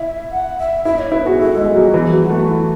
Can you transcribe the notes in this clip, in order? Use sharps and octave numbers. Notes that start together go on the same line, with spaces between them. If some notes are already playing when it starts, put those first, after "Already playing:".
Already playing: E4 E5
F#5
E5
E4 E5
C#5
E4 B4
F#4 G#4
E4 A4
G#3
G#4
F#3
F#4
E3 G#4
F#3
F#4
A3
E4